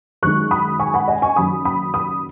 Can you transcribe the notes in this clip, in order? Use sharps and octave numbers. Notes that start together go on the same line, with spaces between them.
F#2 D#3 G#3 C#6 F#6
B5 D#6
G#5 C#6
F#5 B5
D#5 G#5
G#5 C#6
F#1 F#2 D#3 B5 D#6
B5 D#6
B5 D#6